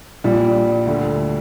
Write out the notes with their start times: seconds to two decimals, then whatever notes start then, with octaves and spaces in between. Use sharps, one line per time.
0.24 A#1 A#2 G3
0.87 D2 D3